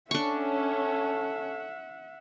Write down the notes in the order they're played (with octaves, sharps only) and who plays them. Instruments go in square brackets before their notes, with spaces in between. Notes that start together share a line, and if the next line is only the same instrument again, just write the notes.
[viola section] C#4 [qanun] D4 C#6 [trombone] A4 [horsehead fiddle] E5 F#5